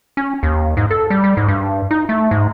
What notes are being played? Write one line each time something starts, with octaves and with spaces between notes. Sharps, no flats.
C#4
D#2
G#2
A4
G3
G3
G#2
G2
D#4
A3
G#2